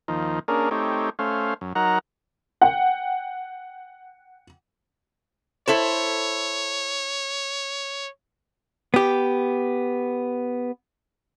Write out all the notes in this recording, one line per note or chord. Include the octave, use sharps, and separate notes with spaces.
D#2 F3 D#4
A#3 C#4 D4 G#4 A#4
A3 C4 D#4 G4 C#5
A3 C#4 C5 F5
F#2
F#3 D#4 A#4 F#5 A#5
F#5 G5
E4 A4 C5 C#5
B3 G4